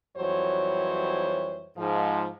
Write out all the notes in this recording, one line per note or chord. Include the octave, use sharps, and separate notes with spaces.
F2 E3 F#3 G3 C5 C#5
G#2 F3